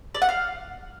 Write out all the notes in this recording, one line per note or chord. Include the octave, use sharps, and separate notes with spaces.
D5
F#5
F5